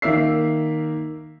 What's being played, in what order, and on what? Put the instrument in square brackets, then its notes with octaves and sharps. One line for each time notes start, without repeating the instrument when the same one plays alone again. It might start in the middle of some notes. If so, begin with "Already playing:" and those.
[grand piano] D#3 A#3 E5 E6 C7